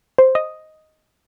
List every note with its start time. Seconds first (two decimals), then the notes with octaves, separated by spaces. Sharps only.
0.18 C5
0.35 D#5